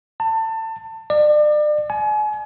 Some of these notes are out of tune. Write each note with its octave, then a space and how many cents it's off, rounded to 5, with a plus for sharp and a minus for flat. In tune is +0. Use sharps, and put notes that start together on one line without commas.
A5 +25
D5 +35
G#5 +35